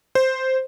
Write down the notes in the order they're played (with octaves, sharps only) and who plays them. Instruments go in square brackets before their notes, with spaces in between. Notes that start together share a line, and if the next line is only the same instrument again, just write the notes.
[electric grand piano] C5